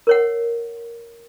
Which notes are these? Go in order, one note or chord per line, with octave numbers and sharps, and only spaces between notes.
A#4 C#5 F#5